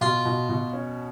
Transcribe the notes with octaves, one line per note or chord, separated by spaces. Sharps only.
B2 F4
B2
B2
C#4